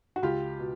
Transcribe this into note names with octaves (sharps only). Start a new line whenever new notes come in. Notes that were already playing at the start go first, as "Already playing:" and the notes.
F#4
C#2 F4 G4
B2